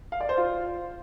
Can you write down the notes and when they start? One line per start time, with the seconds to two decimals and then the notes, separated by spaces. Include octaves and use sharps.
0.12 F5
0.21 D5
0.29 C5
0.37 F4